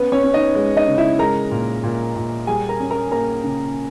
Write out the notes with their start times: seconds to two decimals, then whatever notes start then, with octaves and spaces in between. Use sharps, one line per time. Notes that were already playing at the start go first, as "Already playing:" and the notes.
Already playing: B3 C#4 B4
0.12 C#4 C#5
0.24 C#4
0.34 D#4 D#5
0.55 G#3
0.77 D#4 D#5
0.87 C#3
0.98 E4 E5
1.19 G#3 A#4 A#5
1.51 A#2
1.84 A#2
2.16 A#2
2.47 G3 G#4 G#5
2.69 A#4 A#5
2.80 C#4
2.91 A#4 A#5
3.12 A#3 A#4 A#5
3.44 C#3